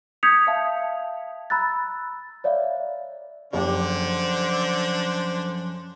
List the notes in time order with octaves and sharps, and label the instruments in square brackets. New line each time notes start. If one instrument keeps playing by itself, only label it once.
[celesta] D#6 G6 G#6 B6 C#7 F7
E5 F5 A5
A#5 B5 E6 F#6 A6
C#5 D5 E5 F5
[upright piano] F#1 G4 [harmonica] D3 D4 [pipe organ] F3 F#3 C#4 [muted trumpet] C5